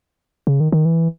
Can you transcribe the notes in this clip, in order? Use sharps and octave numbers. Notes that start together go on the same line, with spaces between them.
C#3
D#3
D#3
E3